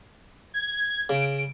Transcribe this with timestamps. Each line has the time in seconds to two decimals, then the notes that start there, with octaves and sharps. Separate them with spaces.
0.54 G#6
1.09 C#3 D7